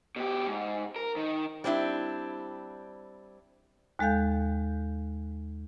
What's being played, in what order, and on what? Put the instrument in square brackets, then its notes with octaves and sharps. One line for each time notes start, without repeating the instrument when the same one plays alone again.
[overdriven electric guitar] B2 G4
G#2
A#4
D#3
[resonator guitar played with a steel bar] G3 C4 D4 E4
[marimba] D#2 G#3 A4 F5 G6